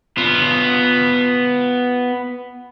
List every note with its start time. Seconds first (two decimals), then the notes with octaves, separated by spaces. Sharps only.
0.17 B3 F4